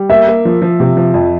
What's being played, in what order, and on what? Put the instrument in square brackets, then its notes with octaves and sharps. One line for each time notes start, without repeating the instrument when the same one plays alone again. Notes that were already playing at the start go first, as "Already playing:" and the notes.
Already playing: [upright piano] G3
[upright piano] A#3 [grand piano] E5
[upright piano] A#3
F3
F3
C3
F3
F2